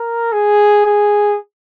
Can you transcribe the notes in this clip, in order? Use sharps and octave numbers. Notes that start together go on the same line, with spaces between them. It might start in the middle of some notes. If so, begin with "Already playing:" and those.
Already playing: A#4
G#4
G#4